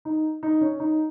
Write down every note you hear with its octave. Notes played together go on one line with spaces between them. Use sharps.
D#4
D#4
C#4
D#4